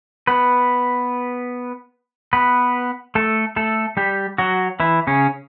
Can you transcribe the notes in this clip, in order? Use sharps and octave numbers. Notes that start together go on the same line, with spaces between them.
B3 B4
B3 B4
A3 A4
A3 A4
G3 G4
F#3 F#4
E3 E4
C#3 C#4